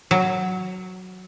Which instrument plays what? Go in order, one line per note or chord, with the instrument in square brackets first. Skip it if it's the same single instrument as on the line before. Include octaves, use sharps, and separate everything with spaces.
[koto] F#3